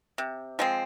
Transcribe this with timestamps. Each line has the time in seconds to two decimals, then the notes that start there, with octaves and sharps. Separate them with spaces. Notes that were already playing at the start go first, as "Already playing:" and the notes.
0.18 C3
0.59 F3 G#3 C4